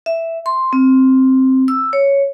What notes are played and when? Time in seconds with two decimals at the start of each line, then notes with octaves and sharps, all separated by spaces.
0.06 E5
0.46 C6
0.73 C4
1.68 E6
1.93 C#5